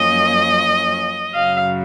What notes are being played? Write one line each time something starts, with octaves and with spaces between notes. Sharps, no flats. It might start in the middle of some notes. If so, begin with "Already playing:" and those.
Already playing: F#2 F3 A#3 C#4 D#5
F#2 C#3 F#3 F5